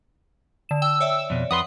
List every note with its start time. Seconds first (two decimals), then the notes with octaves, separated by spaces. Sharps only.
0.69 D3 E7
0.82 G5 E6
1.00 C#5 D5 E5
1.30 F2 B2
1.51 F2 B4 F#5 C6 D#6